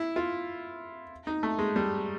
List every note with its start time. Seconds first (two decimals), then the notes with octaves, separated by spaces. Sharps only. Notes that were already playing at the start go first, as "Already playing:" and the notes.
Already playing: E4
0.16 F4
1.27 D#4
1.43 A3
1.59 G#3
1.76 G3